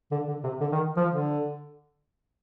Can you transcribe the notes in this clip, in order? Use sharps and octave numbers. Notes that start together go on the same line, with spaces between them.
D3
D3
C3
D3
D#3
F3
D3